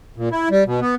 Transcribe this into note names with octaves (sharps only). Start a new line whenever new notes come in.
A#2
E4
G3
B2
B3